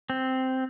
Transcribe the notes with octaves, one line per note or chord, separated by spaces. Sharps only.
C4